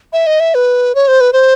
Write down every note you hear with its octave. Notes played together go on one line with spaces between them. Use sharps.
E5
D#5
E5
B4
C#5
C5
B4
C5